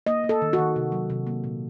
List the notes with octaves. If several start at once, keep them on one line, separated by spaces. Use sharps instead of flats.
A#3 D#5
A#3
A4
D#3
F#4
D#3
C3
F#3
C3
A#3
A#2